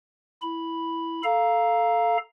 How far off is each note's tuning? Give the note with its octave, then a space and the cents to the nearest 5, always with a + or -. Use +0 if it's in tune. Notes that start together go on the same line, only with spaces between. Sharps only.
E4 +0 B5 +0
A4 +0 F5 +0 A#5 +10